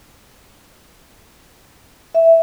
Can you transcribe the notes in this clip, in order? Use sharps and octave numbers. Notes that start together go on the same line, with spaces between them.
E5